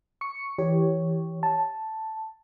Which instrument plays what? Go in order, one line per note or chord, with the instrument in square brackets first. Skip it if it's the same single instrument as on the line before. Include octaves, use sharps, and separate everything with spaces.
[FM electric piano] C#6 C#7
E3 G4 C#5
A5